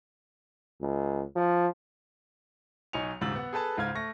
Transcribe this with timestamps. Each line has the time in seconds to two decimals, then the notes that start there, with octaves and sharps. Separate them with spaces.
0.81 C#2
1.36 F3
2.93 B1 D#4 C#5 G#5 C#7 F7
3.21 D#1 G#2 C#3 E6 A6 F#7
3.35 B3 F#5
3.53 G#4 A4 B4 A5
3.77 C#2 G#2 F5 F6 G#6
3.95 A3 C#6 A#6